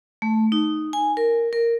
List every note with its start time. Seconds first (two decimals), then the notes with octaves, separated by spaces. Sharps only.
0.22 A3
0.52 D#4
0.93 G#5
1.17 A#4
1.53 A#4